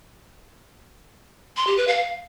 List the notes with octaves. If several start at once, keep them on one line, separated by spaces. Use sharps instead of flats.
C6
G4
B4
F5